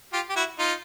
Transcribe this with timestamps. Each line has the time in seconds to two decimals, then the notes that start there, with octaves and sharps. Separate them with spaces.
0.13 F4 G4
0.30 G4
0.36 E4 F#4
0.59 D#4 F4